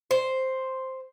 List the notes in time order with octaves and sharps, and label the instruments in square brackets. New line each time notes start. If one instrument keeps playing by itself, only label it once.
[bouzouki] C5